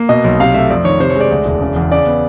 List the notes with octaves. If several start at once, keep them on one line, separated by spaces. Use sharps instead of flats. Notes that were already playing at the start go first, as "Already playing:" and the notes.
Already playing: A#3
B2 D#5
B1
C3 F5
A3 E5
F2 D5
D#3 C#5
C3 C5
C#5
G#3 D5
D2
E1
C#3
E2
C#3 D5
B3